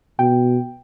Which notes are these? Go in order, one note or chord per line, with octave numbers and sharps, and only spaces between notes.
B2 G5